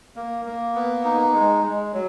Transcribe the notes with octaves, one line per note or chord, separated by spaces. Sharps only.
A#3
A#3
B3
D#4
G#3
G#3
F#3